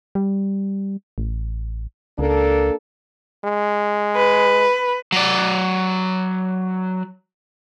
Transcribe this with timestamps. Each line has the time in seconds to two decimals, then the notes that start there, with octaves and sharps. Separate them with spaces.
0.15 G3
1.18 A1
2.19 C#2 A#3 D4 A4
3.44 G#3
4.16 B4
5.12 F#3 D5